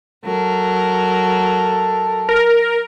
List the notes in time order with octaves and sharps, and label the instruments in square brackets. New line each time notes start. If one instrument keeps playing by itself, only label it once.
[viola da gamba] F#3 A#4 [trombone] A4
[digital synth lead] A#4